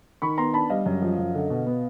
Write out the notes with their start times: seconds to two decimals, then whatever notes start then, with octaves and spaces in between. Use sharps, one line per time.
0.22 D#3 B5 C#6
0.38 B3 A#5 C6
0.54 D4 A5 B5
0.70 G3 D#5 F5
0.86 F#2
1.02 F3
1.18 F#2
1.34 D3
1.50 B2
1.66 B3